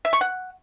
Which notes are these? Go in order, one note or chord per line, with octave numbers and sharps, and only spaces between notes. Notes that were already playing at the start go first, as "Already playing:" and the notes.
E5
C#6
F#5